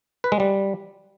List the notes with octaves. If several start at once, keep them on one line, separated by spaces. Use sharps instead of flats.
B4
G#3
G3